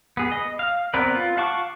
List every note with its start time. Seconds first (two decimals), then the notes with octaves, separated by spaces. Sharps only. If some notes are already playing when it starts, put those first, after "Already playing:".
0.17 B3 G#4
0.32 D#5
0.59 F5
0.94 B3 C4 A#4 B4 D5
1.15 F4
1.37 F5 F#5 A5 C#6 D6